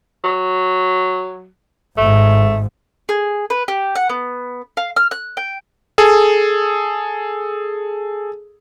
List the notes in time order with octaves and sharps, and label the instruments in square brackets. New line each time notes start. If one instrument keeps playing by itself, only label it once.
[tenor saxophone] F#3
[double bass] G#1 G#2 [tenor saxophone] A3
[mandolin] G#4
B4
G4
F#5
B3
F5
F6
F#6
G5
[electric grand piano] G#4 A4